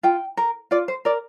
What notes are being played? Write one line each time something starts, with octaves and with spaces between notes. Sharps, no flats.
F4 G5
A#4
F4 D5
C5
A#4 D5